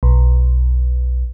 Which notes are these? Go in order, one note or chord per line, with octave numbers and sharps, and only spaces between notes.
B1